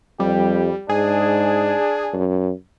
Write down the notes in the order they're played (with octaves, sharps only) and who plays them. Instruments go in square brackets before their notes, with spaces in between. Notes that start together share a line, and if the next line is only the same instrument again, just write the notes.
[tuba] F2 [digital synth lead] G3 [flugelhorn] G4
[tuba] G#2 [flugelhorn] D4 [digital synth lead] G#4
[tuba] F#2